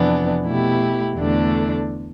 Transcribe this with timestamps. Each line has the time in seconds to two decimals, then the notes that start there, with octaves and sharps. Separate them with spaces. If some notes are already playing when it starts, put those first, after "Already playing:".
Already playing: F2 C3 E3 B3 D4
0.43 B2 A3 E4 G4
1.15 E2 D3 A3 D4 A4